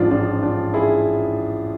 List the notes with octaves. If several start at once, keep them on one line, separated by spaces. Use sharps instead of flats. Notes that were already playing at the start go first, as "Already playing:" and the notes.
Already playing: A1 G#2 F3 D4 F4
D4 F4
D4 F4
E4 G#4